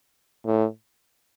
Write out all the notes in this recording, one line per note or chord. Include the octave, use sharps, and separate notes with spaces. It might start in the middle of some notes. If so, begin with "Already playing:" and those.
A2